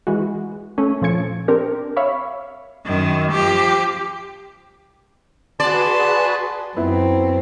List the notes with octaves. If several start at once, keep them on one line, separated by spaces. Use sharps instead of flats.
E3 G#3 F#4
A3 C#4
A#2 F3 C#4 A4 G#6 C#7
C4 D4 G4 A#4
C#5 E5 F5 B5 C#6
F#2 D#3
F3 G4
F#4 G#4 B4 D5 A5 C6
F#2 B3 C4 E4